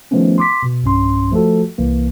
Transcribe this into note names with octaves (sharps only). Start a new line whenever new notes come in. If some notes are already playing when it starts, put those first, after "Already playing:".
D#3 F3 A3 B3 C#4
C6 D6 B6
B2
B1 G2 C#4 C6
F3 A3 F#4 A4
C2 E3 A#3